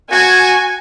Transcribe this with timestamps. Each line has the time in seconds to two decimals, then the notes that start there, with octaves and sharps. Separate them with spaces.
0.12 F#4 G#5